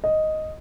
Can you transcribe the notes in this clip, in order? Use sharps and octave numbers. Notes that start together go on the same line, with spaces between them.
D#5